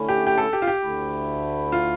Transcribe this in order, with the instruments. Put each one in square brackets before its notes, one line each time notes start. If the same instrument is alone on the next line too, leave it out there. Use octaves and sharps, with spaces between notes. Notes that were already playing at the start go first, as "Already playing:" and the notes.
Already playing: [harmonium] D3 A3 C#4 E4
[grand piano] G4
G4
A4
G4
F4
G4
[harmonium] D2 D3 A3 E4
[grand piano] F4